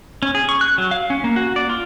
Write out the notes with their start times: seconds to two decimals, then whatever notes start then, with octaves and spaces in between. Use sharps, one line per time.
0.23 C#4
0.35 G#4
0.49 C#6
0.61 F#6
0.78 F#3
0.91 F5
1.10 C#4
1.24 A#3
1.36 F#4
1.56 D5
1.69 F4